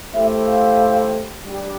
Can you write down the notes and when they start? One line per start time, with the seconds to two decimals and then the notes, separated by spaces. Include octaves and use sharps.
0.14 A3 E4 G4 C5 E5
0.46 F5
1.45 G3 D4 G4